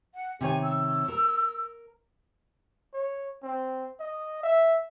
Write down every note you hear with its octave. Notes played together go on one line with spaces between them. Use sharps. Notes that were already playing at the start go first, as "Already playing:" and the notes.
F#5
C3 D#3 C#5 G#5
E6
A#4
C#5
C4
D#5
E5